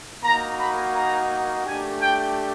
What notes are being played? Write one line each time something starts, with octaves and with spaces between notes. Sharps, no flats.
A#3 D#4 F#4 A#5
B5
A#5
A3 D4 G4 G#5
G5